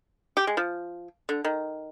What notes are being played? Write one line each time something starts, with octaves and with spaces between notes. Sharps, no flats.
G4
G#3
F3
D3
D#3